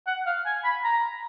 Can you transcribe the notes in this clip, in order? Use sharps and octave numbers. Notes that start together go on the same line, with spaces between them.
F#5
F5
G#5
B5
A#5